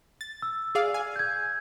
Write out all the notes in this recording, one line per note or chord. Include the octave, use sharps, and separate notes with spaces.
A6
E6
G#4 D5 F5
G#5
G6 G#6